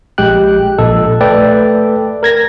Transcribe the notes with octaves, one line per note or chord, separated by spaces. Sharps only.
A#1 G#3 G4 G5 F#6
A#1 A#2 A4 D#5
A3 A4 B4 D5 G5
A#4 G#6 A#6